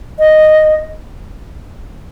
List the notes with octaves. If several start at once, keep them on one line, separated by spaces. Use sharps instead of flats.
D#5